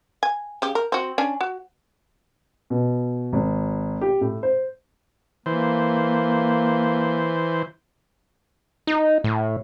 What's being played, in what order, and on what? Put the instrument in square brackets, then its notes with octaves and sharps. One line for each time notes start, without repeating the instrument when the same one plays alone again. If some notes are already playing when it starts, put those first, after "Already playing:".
[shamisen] G#5
C#3 G4
A#4
C4 F#4
C#4 D4 G#5
F#4
[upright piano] B2
G#1
G4
A2
C5
[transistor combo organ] E3 C5 [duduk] A#3
[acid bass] D#4
A2